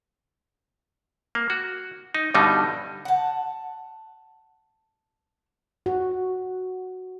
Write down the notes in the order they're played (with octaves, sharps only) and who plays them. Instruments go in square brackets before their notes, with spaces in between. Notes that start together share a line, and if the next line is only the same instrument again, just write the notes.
[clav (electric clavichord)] A#3
F#4
D#4
G2 B2 D3 G3 D#4
[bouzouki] F#5 A5
[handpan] F#4